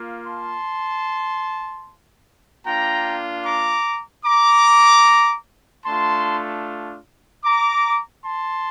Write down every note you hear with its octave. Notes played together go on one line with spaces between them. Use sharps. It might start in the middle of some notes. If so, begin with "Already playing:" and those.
Already playing: A#3 F4
A5 C6
A#3 D4 F4 G5 A#5
A#5 D6
A#5 D6
A3 D4 F4 A5 C6
A#5 D6
A5 C6